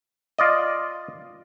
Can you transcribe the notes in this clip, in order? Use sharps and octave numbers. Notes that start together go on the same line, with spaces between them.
F4 D5 D#5